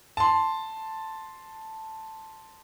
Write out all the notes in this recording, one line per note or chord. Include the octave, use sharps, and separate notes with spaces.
A5 C6